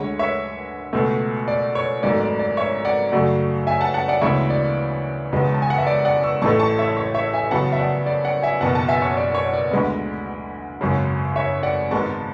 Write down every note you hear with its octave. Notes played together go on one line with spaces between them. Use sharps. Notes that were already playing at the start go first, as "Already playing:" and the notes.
Already playing: D2 D3 G#3 C#5
C#5 E5
C#2 B2 A3
D5
C#5
G#1 G#2 F#3 A3 D5
D5
D5
C#5 E5
D5 F#5
F#2 C#3 F#3 A3 D5 F#5
E5 G#5
F#5 A5
F#5 A5
D5 F#5
D2 C#3 E3 G#3 B3 C#5 E5
D5
E1 E2 C#3 G#3 B3
A5
G#5
F#5
E5
D5
D5 F#5
C#6 E6
A1 A2 E3 A3 A5 C#6
A5 C#6
C#5 E5
C#5
C#5 E5
E5 G#5
E2 C#3 F#3 B3 F#5 A5
E5
D5 F#5
D5
D5 F#5
E5 G#5
F#1 E2 B2 F#5 A5
F#5 A5
E5 G#5
C#5
D5
C#5
D5
D2 D3 G#3 B3
G#1 F#2 C#3
C#5 E5
D5 F#5
G#1 G#2 G#3 B3 A5 C#6